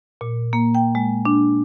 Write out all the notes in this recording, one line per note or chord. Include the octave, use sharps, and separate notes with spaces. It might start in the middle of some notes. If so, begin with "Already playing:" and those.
A#2
A#3
G5
G#3
D4